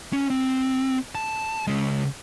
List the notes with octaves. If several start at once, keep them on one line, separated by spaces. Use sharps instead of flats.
C#4
C4
A5
C#3 G#3